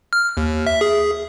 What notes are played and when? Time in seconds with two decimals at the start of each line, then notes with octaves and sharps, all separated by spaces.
0.13 F6
0.37 D#2
0.67 E5
0.81 G#4